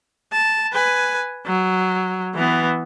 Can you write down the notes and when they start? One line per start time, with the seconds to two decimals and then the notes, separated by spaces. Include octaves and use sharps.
0.32 A5
0.73 B4 G#5
1.46 F#3
2.34 E3 B3